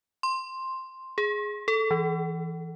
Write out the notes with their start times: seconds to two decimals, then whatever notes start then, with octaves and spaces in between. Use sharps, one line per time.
0.23 C6
1.18 G#4
1.68 A4
1.91 E3